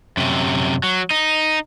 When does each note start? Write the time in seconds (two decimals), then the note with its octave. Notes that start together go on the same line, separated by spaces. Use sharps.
0.17 F#2 C3
0.83 F#3
1.10 D#4